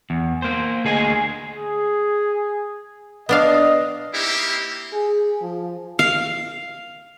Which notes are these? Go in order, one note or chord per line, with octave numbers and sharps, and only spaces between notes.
E2
A#3 C5
D2 G#4 D#5 G#5
G#4
B3 D4 D#5 F5
A#3 C4 D#4 E4 G4
G#4
F3
F5